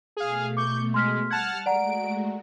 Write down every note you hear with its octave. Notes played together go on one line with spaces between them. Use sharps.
B2 A3 G#4 F5
C#6 D6 G6
G#3 C6 F6 B6
G3 F#5 A5 F6 G#6
G#3 A3 F#4 D5 F#5 A#5 D7